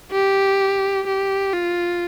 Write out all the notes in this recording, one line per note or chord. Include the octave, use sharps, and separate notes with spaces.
G4
G4
F4